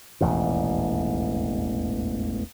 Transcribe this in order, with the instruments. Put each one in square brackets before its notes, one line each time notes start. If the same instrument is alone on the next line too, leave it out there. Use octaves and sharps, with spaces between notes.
[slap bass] E1 A1 D#2 A#2